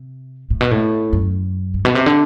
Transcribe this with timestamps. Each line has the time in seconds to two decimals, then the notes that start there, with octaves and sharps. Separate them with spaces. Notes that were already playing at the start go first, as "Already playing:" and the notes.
Already playing: C3
0.50 A2
0.61 B2
0.71 A2
1.13 F#2
1.74 G2
1.85 B2
1.95 C3
2.06 D3